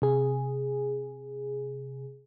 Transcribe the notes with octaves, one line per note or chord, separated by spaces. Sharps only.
C3 G#4